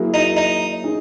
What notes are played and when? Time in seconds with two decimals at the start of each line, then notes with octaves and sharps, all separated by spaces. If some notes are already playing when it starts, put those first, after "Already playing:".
Already playing: F#3 A#3 E4 G#4
0.14 D#4
0.37 D#4
0.84 D#4 G#4